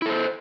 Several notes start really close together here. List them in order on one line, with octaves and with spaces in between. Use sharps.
E4 A4 C5